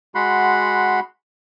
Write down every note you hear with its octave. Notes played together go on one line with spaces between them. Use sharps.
G#3 F#4 F#5 B5 C6